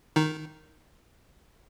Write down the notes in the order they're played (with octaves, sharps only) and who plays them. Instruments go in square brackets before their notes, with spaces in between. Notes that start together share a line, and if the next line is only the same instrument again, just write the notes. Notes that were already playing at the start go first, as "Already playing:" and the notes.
[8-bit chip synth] D#3 D#4